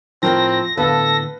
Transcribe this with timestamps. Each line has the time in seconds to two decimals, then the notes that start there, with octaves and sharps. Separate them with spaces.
0.23 A2 F3 C4 A#4 G5 A#6
0.78 A2 D3 B3 A4 B4 F5